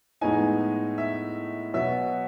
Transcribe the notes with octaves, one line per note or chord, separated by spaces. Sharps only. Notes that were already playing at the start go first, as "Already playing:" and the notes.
A2 F3 G#3 B3 D#4 G#5
E5
B2 F#3 B3 E5